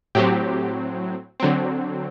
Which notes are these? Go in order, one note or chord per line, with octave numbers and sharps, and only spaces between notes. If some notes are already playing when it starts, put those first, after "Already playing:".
A2 F#3 C4 G4
D3 F#3 C4